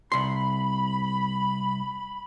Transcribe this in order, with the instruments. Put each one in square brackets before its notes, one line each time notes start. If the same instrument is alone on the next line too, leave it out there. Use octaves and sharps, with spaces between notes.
[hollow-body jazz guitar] C2 C6 [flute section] B5